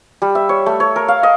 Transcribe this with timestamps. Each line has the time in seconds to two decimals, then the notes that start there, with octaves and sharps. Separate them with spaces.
0.22 G3
0.35 E5
0.49 C#5
0.66 A3
0.80 C#5
0.96 A#4
1.08 F5
1.23 D#5